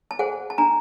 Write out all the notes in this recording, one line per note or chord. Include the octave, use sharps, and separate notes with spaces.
A5
G#4 C5 F#5 G#5
A5
D4 G#5 A#5